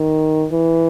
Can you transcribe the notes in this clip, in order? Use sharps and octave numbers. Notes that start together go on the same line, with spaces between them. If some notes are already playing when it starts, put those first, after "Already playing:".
Already playing: D#3
E3